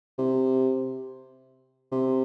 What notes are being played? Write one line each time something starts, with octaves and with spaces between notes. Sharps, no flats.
C3
C3